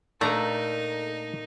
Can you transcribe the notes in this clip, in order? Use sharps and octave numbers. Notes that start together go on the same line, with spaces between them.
A#2 A3 D4 D#4 A4 A#4 D5 A#5